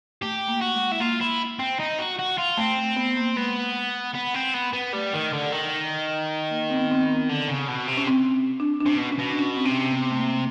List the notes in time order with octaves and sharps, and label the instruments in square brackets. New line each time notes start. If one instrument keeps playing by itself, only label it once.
[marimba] A3 [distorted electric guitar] G4
[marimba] A#3
[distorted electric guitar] F#4
[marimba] G#3
[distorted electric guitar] E4
[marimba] A#3 [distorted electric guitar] F4
[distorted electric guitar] E4
C4
D#4
F#4
F#4
F4
[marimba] A3 [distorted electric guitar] C4
[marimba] B3
A#3
[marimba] G#3 [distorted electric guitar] B3
[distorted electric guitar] B3
C4
B3
B3
[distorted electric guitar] G3 [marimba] A3
[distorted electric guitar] D#3
D3
D#3
[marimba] A#3
C4
B3
C4
B3
[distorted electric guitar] D3
C#3
B2
C3
[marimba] C#4
C4
D4
D4
[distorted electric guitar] C3 [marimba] C#4
[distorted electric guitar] B2
[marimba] C#4
[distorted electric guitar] B2
[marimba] D4
C#4
C4
[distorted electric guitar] C3 [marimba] C#4
[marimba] B3
A3
A#3